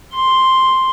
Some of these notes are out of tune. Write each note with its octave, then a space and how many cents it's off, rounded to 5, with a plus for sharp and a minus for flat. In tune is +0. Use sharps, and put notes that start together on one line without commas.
C6 +0